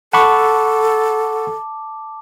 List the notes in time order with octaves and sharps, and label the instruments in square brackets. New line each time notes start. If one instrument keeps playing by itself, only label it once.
[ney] A4 [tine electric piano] F#5 B5 C#6 [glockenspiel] A5 D6